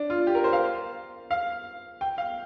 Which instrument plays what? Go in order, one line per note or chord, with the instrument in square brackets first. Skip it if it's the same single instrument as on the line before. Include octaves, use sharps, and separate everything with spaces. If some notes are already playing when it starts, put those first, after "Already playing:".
Already playing: [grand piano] D4
F4
G4
A#4
C5
F5
F5
G5
F5